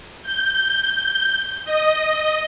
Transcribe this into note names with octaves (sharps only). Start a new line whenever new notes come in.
G6
D#5